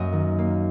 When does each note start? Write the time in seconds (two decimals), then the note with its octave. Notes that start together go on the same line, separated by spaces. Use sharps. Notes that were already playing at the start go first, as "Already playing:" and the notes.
Already playing: F#2 A#3 D#5
0.13 D#3
0.39 A#3